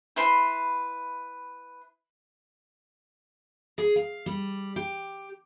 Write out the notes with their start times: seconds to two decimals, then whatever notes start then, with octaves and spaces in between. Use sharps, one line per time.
0.16 E4 B4 E5 C6
3.78 G#4
3.96 F5
4.26 G3
4.76 G4